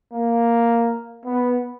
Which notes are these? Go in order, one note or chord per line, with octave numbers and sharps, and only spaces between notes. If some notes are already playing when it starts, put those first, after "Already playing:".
A#3
B3